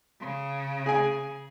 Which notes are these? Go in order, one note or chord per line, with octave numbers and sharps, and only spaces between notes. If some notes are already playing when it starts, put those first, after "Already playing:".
C#3
G#4 G#5